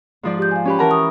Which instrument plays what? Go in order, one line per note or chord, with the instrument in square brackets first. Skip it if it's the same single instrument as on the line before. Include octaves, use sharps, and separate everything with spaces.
[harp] G#2 F3 D5
[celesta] G4 G6
F5 G#5
[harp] C#4 G4 B4
[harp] E3 A#4 A#5 [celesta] F#5 A5
[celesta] C#6 D#6